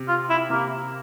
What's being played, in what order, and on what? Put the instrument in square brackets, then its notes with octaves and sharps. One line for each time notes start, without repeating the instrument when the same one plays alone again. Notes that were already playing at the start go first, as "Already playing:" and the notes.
Already playing: [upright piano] C3
[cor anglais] F4
E4
[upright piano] C3 [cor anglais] A#3